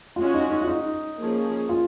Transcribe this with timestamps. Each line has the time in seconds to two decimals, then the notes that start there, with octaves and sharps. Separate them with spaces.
0.16 G#3 C#4 F4 F#4
0.34 D#4
0.50 D#4
0.62 F4
0.68 D#4
1.18 F3 A#3 C#4 G#4
1.69 F4